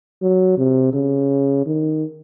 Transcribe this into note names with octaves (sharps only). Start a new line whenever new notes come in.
F#3
C3
C#3
D#3